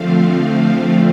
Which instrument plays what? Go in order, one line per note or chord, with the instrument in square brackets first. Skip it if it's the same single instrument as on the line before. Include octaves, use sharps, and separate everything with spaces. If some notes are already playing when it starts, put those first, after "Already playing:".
Already playing: [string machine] D3 F3 A3 C4 F5